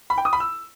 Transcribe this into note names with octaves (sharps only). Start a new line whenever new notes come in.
B5
G5
D#6
B5
E6